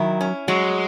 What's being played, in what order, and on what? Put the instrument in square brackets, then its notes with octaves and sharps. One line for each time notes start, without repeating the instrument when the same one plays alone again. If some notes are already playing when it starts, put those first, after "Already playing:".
Already playing: [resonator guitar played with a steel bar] D#3 E4 [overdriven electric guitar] F#3
[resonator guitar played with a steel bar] C#4
[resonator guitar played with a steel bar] F#3 [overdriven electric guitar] G#3